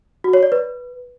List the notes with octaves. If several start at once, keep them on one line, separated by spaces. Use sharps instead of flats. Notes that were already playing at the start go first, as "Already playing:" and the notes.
F#4
C#5
D5
B4